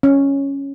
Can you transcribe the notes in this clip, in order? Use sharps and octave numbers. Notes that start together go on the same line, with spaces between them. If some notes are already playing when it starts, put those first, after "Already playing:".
C#4